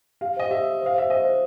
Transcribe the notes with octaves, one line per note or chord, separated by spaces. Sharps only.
G4 F5
C5 D#5
G4 E5
G4
C5 F5
C5 E5
C5 D#5
C5